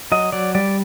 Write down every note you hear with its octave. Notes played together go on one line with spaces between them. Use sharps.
F#3 D#5
F#3 D5
G3 D5